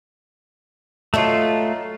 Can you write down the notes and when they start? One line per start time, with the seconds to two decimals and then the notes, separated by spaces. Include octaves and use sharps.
1.14 F#3 A3 D#4 F4 A4